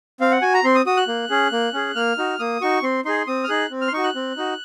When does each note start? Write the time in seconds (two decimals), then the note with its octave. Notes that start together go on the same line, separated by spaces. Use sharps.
0.20 C4 F5
0.32 F#5
0.42 F#4 G#5
0.54 A#5
0.64 C4 C6
0.75 D#6
0.86 F#4 D#6
0.97 F#6
1.08 A#3
1.30 C#4 G#4
1.52 A#3
1.74 C#4 G#4
1.95 A#3 F6
2.18 D#4 F#4
2.39 A#3 D#6
2.61 D#4 F#4 C#6
2.83 C4 C6
3.05 D#4 G#4 C6
3.27 C4 D#6
3.44 F6
3.49 D#4 G#4 F#6
3.71 C4
3.81 F6
3.88 C6
3.92 D#4 F#4 C#6
4.04 F#6
4.15 C4
4.37 D#4 F#4